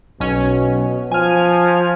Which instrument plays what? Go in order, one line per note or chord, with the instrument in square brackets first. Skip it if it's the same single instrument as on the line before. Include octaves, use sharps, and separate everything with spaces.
[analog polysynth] B1 C#4 [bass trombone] B2
[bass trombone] F3 [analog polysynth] G#5 F6